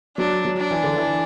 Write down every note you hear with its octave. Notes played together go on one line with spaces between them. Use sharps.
F#3 D4
F#3
D4
E3
D3
E3